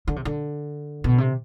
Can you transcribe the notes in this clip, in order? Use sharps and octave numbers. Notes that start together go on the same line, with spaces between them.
D3
C3
D3
B2
C3